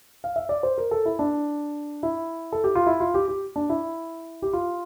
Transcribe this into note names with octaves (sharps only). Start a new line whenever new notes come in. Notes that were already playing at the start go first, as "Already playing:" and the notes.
F5
E5
D5
C5
A#4
A4
E4
D4
E4
A4
G4
F4
E4
F4
G4
G4
D4
E4
G4
F4